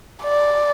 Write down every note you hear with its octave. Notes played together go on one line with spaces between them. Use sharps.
D5